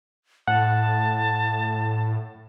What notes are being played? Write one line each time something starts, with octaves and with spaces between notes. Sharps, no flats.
A2 F#5 A5